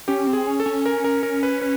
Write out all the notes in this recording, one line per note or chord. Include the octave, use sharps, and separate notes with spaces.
C#4 G4
C4
G#4
C#4
A4
C#4
A#4
A#4
A#4
B4
B4